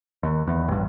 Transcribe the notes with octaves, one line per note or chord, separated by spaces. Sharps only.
D#2
E2
A1 G2